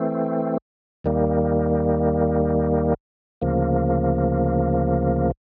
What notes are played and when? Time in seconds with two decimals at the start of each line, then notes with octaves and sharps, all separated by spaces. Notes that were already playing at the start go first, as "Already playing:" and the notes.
Already playing: E3 A3 C4
1.04 D#2 D#3 G3 A#3
3.42 D2 C#3 F3 A#3